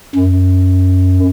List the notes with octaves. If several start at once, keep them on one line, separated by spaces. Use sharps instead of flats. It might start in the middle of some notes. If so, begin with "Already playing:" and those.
F#2